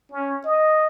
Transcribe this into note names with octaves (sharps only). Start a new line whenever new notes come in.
C#4
D#5